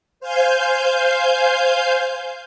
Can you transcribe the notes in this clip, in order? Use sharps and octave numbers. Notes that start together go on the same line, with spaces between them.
C5 F5 G#5 G6